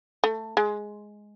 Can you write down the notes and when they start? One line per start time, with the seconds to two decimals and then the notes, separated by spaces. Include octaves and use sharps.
0.24 A3
0.57 G#3